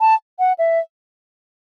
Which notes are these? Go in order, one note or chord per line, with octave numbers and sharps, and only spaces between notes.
A5
F#5
E5